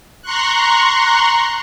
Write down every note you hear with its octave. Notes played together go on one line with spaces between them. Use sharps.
A#5 C6 C#6 F#6